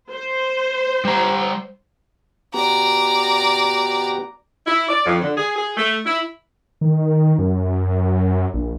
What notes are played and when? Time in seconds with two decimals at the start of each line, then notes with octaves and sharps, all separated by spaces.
0.11 C5
1.05 G3 A#5
2.54 B3 F#4 G4 D5 A#5
4.66 E4
4.89 D5
5.06 F2
5.21 D3
5.37 G#4
5.56 G#4
5.77 A3
6.06 E4
6.81 D#3
7.39 F#2
8.54 A#1